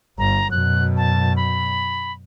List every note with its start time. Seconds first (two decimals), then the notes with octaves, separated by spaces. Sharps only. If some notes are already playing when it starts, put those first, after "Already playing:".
0.19 G1 A#5
0.51 F#2 B2 F#6
0.97 A5
1.36 B5